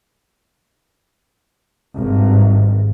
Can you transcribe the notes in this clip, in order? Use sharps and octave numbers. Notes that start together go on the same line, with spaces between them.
G#1 G2